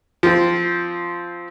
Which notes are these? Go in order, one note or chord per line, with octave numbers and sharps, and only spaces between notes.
F3 C4